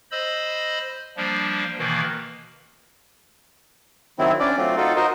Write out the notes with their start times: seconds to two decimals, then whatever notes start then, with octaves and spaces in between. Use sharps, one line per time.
0.11 C5 D#5 B5 E6
1.17 F3 G3 A#3 D4
1.79 B2 D#3 E3 A#3
4.19 D#3 F#3 C4 E4
4.40 C#4 D4 D5
4.58 F#3 A3 C4 F4
4.77 D#4 F4 F#4 A4
4.96 D#4 F#4 A#4 C5 D#5